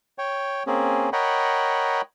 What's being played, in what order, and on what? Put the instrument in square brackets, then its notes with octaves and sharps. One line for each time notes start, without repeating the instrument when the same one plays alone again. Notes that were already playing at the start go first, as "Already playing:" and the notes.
[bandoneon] C#5 G5
A#3 C4 C#4 G#4
A#4 C#5 D#5 F#5 G5 B5